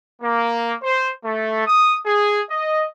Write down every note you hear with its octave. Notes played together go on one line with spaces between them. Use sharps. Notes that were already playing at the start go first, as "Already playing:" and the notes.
A#3
C5
A3
D#6
G#4
D#5